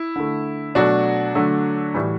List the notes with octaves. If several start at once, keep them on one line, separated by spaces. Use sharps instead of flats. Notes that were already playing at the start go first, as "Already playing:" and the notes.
Already playing: E4
D3 A3
B2 F#3 A3 D4 F#4
D3 F#3 A3
A2 E3 G3